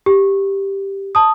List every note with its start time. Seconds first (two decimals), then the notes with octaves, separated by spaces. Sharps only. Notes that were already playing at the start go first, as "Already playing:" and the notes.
0.06 G4
1.15 A5 D#6